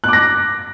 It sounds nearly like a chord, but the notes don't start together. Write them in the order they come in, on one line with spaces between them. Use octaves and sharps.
F#6 D6 A#6